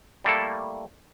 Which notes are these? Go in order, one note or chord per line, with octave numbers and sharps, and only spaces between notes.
G3 A3 A#3 E4 A4